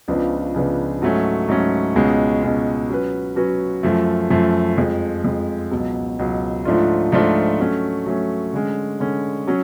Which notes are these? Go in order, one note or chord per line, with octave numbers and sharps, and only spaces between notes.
C#2 C#3 F3 B3 D4
C#2 C#3 F3 B3 D4
G#2 F#3 A3 C#4
G#2 F#3 A3 C#4
C#2 B2 G#3 C#4
C#2 B2 G#3 C#4
F#3 C#4 F#4 B4
F#3 C#4 F#4 B4
F#2 F3 A3
F#2 F3 A3
F2 F3 G#3
F2 F3 G#3
C#2 B2 F#3
C#2 B2 F#3
G#2 F3 A3 D4 F4
G#2 F3 A3 D4 F4
F#3 A3 C#4
F#3 A3 C#4
D3 G#3 C#4
D3 G#3 C#4
F#3 C#4